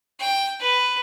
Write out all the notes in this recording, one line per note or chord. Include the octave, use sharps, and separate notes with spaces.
G5
B4